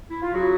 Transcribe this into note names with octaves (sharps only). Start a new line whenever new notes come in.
E4
F4
C#3 F#3 E4 F#4